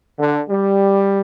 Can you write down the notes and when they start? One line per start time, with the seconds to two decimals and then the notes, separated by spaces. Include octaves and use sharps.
0.19 D3
0.49 G3